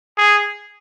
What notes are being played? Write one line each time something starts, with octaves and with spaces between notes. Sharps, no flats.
G#4